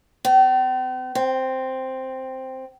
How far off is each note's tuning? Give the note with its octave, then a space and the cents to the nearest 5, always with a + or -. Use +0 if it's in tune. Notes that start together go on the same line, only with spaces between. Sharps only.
C4 -45
C4 +0